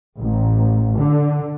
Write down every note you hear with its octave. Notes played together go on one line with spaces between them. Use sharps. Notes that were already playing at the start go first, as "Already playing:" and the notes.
A1
D3